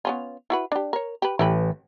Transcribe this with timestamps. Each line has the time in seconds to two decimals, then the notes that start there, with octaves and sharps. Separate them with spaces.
0.05 B3 C#4 F4
0.50 E4 F#4 B4
0.72 D4 G4
0.93 A#4 C#5
1.22 G4 B4
1.39 A1 E4 G4 B4